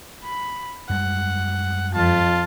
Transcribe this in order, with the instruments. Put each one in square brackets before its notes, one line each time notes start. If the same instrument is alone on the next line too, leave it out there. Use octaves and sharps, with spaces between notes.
[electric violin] B5
[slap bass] F#2 G3 G#3 [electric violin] F#5
[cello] F2 [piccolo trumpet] F4 [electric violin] A5